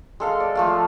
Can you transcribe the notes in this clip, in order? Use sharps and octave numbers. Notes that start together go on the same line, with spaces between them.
G#3 A4 F5
D5
F3 A3 F5